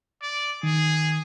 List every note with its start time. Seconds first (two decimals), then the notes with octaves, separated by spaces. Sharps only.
0.22 D5
0.63 D#3 G#4